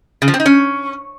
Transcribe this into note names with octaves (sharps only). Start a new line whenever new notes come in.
C#3
F3
C4
D#4
C#4